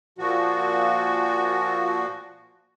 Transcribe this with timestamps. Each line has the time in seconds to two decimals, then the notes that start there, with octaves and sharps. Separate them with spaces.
0.18 A#2 F3 F#4